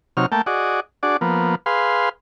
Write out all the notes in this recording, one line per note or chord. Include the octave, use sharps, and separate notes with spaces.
C3 F#3 D#4 C#5 F6
A3 A#3 G5 A5
F#4 G#4 D5 D#5
D4 F#4 G#4 D5
F3 A#3 B3
G#4 B4 F5 C6